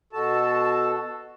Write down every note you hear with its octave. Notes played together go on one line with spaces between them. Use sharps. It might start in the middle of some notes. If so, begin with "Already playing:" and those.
B2 F#4 A4 A5